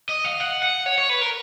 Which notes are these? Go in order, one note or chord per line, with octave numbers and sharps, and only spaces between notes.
D#5
F5
F#5
F#5
C#5
C#5
B4
A#4